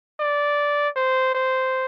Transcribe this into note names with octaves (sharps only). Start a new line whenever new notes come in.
D5
C5
C5